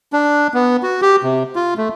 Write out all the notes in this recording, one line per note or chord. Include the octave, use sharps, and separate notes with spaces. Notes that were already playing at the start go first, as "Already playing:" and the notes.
D4
B3
F#4
G4
C3
F4
A3